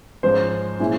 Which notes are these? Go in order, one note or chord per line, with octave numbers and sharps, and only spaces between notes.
G#2 F3 G#3 C#4 C5
A#2 F3 G#3 C#4 E4